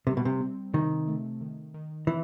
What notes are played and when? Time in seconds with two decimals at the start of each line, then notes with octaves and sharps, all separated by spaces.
0.07 C3 G3
0.17 B2
0.25 C3
0.41 C4
0.74 C3 D#3
1.08 A3
1.41 D#3
1.74 D#3
2.07 E3 C4